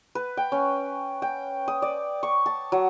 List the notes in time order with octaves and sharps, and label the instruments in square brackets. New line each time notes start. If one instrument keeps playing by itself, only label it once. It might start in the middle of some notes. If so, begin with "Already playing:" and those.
[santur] B4
G5
C#4
G5
D#6
D5
C#6
A5
F#3